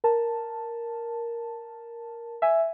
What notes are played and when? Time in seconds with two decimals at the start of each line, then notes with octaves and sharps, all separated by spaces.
0.04 A#4 A5
2.42 E5 G#5